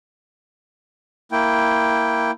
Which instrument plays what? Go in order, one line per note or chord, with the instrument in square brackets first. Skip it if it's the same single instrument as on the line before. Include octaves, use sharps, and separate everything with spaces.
[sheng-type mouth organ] A#3 E4 G5